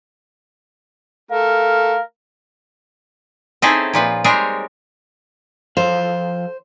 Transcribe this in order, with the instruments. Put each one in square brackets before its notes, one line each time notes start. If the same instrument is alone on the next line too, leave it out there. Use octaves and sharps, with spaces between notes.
[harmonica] A3 [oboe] A#4 [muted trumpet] F5
[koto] C4 C#4 D#4 E4 G#4 A4
A#2 F3 B4
G3 G#3 C4 G#4 A#4 C#5
[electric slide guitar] F3 A4 F5 [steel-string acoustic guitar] C5